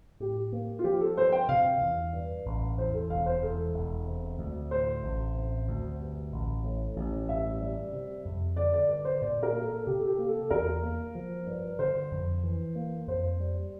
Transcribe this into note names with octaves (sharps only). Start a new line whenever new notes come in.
A2 G4
A#3
F4
F3 G4
A4
G2 C5
G5
C3 F5
E2
G2
A1
E2 C5
A4
E1 F5
C5
E2 A4
E1
C3
D2
A2 C5
A1
C3
D2
G2
A1
A2
A1
G2 E5
G3
C3
F2
D3 D5
D5
G2 D5
C5
A#2 D5
A#4
A#3
A4
C3 G4
A4
G4
A#3
A4
E2 A#4
A#3
F3
G2
D3 C5
F2
E3
A#3
F2 C5
G3